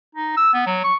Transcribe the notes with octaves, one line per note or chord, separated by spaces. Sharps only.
D#4
E6
B3
F#3
C#6